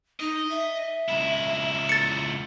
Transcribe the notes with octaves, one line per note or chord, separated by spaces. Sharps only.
D#4 D#5
E5
C#2 E4
A6 C#7